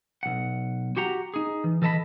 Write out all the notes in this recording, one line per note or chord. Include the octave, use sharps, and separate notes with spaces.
B1 F#5
F#4 G4 F#5 A#5
D#4 G#4
E3
E3 A4 D#5 A5 B5